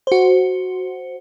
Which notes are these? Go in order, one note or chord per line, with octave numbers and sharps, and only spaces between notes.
F#4 C5